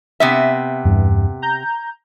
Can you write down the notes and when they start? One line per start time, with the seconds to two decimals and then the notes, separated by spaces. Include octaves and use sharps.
0.20 C3 B3 E5
0.84 E2 G2
1.42 A#5 G6